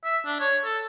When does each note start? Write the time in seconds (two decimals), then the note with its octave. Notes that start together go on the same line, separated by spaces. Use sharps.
0.04 E5
0.26 D4
0.40 C#5
0.64 A4